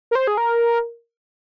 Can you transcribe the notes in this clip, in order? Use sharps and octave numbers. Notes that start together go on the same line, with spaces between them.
A#4
C5
G#4
A#4